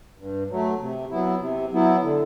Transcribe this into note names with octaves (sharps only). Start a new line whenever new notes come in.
G2
F#3 A3
C3
F#3 B3 E4
C3
F#3 B3 E4
D3